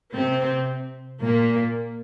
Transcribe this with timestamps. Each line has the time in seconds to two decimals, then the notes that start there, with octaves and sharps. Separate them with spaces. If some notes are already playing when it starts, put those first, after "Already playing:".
0.15 C3 C4
1.24 A#2 A#3